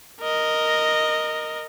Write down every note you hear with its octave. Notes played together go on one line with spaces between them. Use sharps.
A#4 D#5